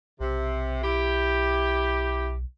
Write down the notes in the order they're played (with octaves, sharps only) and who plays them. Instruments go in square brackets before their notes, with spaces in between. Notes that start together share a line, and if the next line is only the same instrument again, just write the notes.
[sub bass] B1 [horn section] C3
[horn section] E4 G4